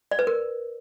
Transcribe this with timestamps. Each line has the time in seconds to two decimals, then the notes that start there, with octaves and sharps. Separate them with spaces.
0.11 D5
0.19 B4
0.27 A#4